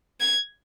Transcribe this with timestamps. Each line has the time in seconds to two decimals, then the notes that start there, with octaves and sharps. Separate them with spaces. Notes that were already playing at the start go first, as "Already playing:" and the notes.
0.20 G#6